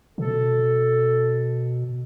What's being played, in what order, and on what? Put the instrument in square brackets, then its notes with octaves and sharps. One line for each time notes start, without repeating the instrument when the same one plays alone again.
[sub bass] B2 [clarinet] A4